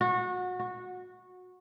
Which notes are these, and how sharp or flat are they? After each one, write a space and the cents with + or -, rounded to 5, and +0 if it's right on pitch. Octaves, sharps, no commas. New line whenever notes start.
F#4 -25
F#4 -15